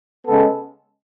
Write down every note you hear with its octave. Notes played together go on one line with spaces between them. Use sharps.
C#3 G#3 B3 A4